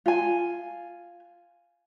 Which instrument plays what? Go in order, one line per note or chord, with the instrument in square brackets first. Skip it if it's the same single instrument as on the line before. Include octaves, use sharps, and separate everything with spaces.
[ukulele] F4 G#5